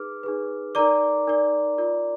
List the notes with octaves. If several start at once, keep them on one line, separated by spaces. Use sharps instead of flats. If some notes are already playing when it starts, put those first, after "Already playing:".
Already playing: D#4 G#4 B4 D6 F6
D#4 G#4 B4
D#4 A#4 D5 A#5 D6
D#4 A#4 D5
F4 A#4 D5